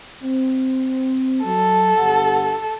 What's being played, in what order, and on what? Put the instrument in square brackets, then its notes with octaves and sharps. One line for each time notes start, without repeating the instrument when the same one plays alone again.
[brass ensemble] C4
[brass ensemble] F#3 [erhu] A4
[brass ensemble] G1 G4 F#5